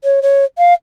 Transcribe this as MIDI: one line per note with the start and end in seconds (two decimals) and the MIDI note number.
0.04 0.20 73
0.22 0.44 73
0.58 0.73 77